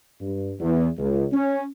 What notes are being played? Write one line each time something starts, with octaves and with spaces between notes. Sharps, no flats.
G2
E2
C#2
C#4